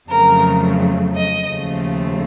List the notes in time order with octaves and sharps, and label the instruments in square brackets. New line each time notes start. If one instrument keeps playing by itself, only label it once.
[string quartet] F2 C#3 F#3 A3 A#4
D#5
D#2 C#3 F3 A3